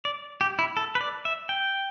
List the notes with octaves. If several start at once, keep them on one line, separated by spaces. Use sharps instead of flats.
D5
G4
E4
A4
B4
D5
E5
G5